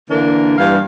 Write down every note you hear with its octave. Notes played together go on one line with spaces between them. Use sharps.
D3 E3 A#3 D4 A#4
G2 E3 G3 F5